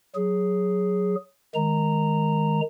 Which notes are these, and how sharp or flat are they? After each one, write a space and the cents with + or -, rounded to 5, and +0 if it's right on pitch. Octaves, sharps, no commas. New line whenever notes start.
F#3 +0 G#4 +0
D#3 -5 G#3 +0 A#5 -10